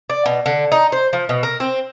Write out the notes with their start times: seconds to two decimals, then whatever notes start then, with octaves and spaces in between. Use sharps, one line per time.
0.10 D5
0.26 B2
0.46 D3
0.72 D#4
0.92 C5
1.13 F3
1.29 B2
1.43 A#4
1.60 C4